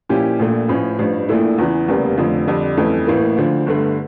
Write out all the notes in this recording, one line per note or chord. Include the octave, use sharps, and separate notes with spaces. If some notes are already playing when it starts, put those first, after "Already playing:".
A#2 F3 C#4 E4 G4
A#1 A#2 A3
A1 A2 F3 C#4
A1 G2 F3
A#1 A#2 A3 E4
E2 C#3 E3
F1 E2 C#3 G3 A#3
F1 F2 D3 F3
F2 D3 G3 D4
G1 F2 E3 A3 C#4
A1 A2 E3 A#3
D2 D3 F3
G1 G2 D3 A3